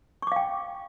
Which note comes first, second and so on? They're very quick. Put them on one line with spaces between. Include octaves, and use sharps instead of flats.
C#6 D6 F5 G5